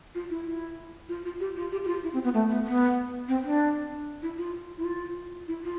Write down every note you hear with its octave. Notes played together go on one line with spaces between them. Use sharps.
F4
E4
E4
F4
F4
G4
F4
G4
G4
F4
E4
C4
B3
A3
B3
B3
C4
D4
E4
F4
E4
F4
E4
F4